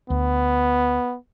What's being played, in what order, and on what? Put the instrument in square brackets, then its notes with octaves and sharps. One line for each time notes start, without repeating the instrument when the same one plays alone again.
[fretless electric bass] D2 [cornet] B3